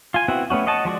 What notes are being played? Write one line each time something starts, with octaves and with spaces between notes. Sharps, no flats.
F4 G#5
B3 C4 E4 F#4
A3 B3 C#4 F#4
C#5 D#5 F#5 A5
F3 G#3 F#4 D5